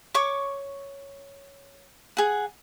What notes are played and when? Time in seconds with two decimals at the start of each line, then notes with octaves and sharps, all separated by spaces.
0.14 C#5 C#6 D6
2.17 G#4 F#5